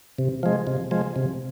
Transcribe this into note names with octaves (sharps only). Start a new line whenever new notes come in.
C3
F3 G#3
C3
F3 G#3
C3